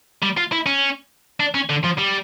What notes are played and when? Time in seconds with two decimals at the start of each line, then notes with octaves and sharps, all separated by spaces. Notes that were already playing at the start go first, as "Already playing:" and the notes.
0.23 G3
0.38 F4
0.52 E4
0.66 C#4
1.40 D4
1.54 C#4
1.70 D3
1.84 F3
1.98 G3